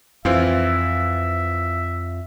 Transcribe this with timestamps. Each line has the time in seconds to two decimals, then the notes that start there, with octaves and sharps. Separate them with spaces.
0.25 F2 E3 C4 F4 E5